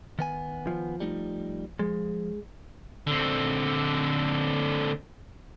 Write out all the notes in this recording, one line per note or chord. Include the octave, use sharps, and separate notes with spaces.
D#3 B3 G#5
F3
G3 A3 D#4
F3 G#3
D3 C4